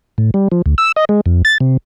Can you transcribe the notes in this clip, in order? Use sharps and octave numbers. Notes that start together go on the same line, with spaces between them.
A2
G3
F3
D2
E6
D#5
G#3
F2
A6
C3